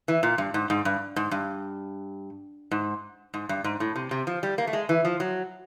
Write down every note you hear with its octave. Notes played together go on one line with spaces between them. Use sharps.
E3
A#2
G2
G#2
G#2
G2
G#2
G2
G#2
G#2
G2
G#2
A2
C3
C3
F3
G3
A#3
A3
G#3
E3
F3
F#3